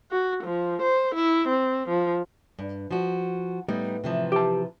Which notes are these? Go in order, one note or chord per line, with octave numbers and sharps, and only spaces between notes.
F#4
F3
C5
E4
C4
F3
G2
F3 F#4
A2 G3 B3 D#4
C3 E3 F3
G4 A5